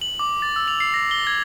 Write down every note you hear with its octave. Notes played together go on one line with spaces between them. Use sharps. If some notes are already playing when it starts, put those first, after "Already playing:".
F#7
D6
A6
E6
F7
C7
A#6
G7
G#6